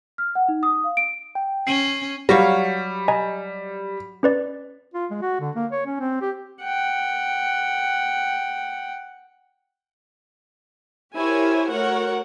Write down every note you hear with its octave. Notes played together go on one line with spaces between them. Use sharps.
F6
F#5
D#4
D#6
F5
D7
G5
C#4 C7
F#3 G3 C#5 F5 A#6
D#5 G#5 A#5
C#4 B4 D5
F4
G#3
F#4
D3
A#3
C#5
C#4
C4
G4
F#5 G5
E4 G4 A#4 C5 C#5 G#5
A3 F#4 A#4 C#5 F#5